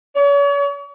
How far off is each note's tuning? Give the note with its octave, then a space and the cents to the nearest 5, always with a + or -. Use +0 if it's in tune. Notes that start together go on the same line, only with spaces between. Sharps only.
C#5 +40